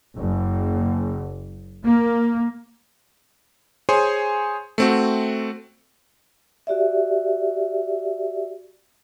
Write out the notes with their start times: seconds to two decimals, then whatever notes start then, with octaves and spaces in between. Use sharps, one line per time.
0.16 F#1
1.84 A#3
3.89 G#4 C5 C#5 G#5 C6
4.78 A3 C4 F#4
6.67 F#4 G4 D5 E5